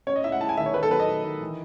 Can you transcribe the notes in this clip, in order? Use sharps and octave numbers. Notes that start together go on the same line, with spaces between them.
C#4 C#5
D#5
E4 E5
F#5
E4 A5
G#5
D#3 E5
C#5
D#3 B4
A4
F#3 B4
D#5
D#3
D#3
E3